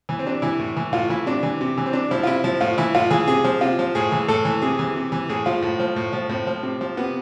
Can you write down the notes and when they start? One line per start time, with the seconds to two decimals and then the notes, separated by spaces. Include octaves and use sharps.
0.09 E3
0.19 C4
0.26 C3 D4
0.42 E3 E4
0.59 A2
0.77 E3
0.93 A2 F4
1.09 E3 E4
1.26 C3 D4
1.43 E3
1.61 C3
1.78 E3
1.86 C4
1.93 C3 D4
2.11 F3 E4
2.23 F4
2.27 C3 E4
2.44 F3
2.61 A2 F4
2.78 E3 E4
2.95 A2 F4
3.11 E3 G#4
3.28 C3 G#4
3.44 F3
3.61 C3 F4
3.79 F3
3.95 A2 G#4
4.12 E3
4.28 A2 A4
4.45 E3
4.62 C3 G#4
4.79 E3
4.96 C3
5.12 E3
5.29 A2 G#4
5.46 F3 F4
5.62 A2
5.80 F3
5.96 A2
6.13 F3
6.29 A2 C4
6.47 F3
6.63 C3
6.81 F3
6.97 C3 B3